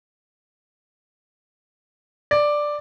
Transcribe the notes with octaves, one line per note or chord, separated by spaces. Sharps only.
D5